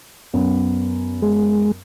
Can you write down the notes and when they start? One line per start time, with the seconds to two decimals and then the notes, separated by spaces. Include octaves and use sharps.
0.34 F#2 B3
1.22 G#3